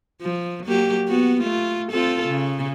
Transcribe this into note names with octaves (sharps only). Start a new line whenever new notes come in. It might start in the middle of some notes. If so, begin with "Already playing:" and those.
F3
F#3 A#3 G4
B3 F#4
A3 F4
C4 F4 A4
C#3